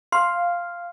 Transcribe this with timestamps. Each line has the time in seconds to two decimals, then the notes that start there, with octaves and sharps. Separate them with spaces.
0.12 F5 C6